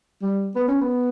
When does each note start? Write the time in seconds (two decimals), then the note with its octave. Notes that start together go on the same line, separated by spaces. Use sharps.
0.22 G3
0.56 B3
0.68 C#4
0.81 B3